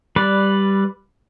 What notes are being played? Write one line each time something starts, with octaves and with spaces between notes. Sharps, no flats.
G3 B4 D5